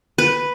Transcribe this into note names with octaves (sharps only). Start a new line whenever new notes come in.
B4